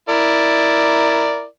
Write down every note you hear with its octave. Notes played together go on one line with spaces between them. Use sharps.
E4 A#4 D5